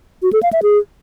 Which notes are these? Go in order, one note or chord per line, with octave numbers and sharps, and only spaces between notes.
F#4
A4
F5
E5
G#4